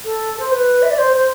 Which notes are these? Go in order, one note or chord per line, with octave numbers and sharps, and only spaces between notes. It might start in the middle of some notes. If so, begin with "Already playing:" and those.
A4
C5
B4
E5
D5
C5
C5